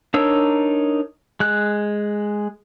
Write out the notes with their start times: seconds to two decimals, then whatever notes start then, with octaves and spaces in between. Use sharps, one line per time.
0.14 D4 D#4 A#4 C#5 E6
1.40 G#3 F#6